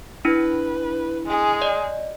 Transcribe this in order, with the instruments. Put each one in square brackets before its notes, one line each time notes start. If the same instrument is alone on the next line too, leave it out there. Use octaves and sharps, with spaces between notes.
[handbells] D4 E4 [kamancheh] B4
[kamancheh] G#3 G#4
[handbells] D5 D#5